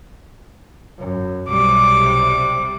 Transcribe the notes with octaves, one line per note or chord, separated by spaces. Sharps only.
F#2
B1 C3 G3 D6